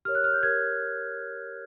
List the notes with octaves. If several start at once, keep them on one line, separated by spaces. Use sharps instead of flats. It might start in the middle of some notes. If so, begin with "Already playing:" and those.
G4 A#4 C#5 F6
F#6
F6
G6
G4 A#4 C#5 G#6